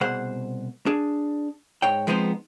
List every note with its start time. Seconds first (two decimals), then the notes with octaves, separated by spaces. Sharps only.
0.01 C2 B2 G#4 C5 F#5
0.86 D4 G#4
1.82 G#2 C#5 G5
2.07 F3 G#3 B3 C4 D#4 C5